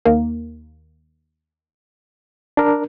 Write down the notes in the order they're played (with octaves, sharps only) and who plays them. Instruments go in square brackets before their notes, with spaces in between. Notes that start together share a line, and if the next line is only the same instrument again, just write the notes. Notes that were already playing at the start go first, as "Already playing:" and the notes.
[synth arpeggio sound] D#2 A#3
[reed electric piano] D4 A#4